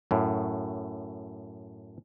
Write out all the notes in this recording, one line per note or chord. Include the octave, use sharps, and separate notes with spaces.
F#2 A2